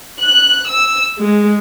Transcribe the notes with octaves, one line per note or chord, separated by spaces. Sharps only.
F#6
E6
G#3